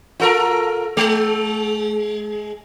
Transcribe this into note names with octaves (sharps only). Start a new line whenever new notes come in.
F4 A4 A#4
G#3